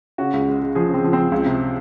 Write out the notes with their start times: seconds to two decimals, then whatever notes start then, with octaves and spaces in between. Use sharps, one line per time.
0.18 C#3 F#4
0.33 C#2
0.48 G#3
0.62 G#3
0.75 F3 G#4
0.89 C#3 C4
1.04 F3
1.13 C4
1.18 F3
1.32 C#2
1.46 C3